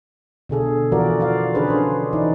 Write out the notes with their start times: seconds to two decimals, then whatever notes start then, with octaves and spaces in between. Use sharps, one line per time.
0.49 B2 D3 G#4 A4
0.92 E3 F3 F4 F#4 A#4 D5
1.20 F4 D5 F5
1.54 D3 C#4 D4 G#4 B4 C5
1.68 C#4 C5
2.13 E3 D#4 E4 D5